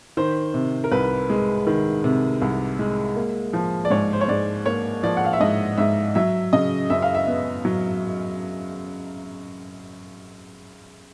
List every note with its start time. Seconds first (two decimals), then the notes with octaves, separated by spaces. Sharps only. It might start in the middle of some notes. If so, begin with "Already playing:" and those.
0.17 D#3 C5
0.54 C3
0.84 A#4
0.92 C2 B4
1.30 G#3
1.67 D#3
2.04 C3
2.42 C2
2.79 G#3
3.16 A#3
3.53 F3
3.85 D5
3.90 G#2 C#5
4.13 C5
4.21 C#5
4.28 G#2 D5
4.66 A#3 C#5
5.03 F3 D5
5.17 F#5
5.24 F5
5.33 E5
5.40 G#2 D#5
5.78 G#2 E5
6.15 F#3 E5
6.53 C#3 D#5
6.90 F#2 E5
7.02 F5
7.15 E5
7.27 B3
7.65 F#3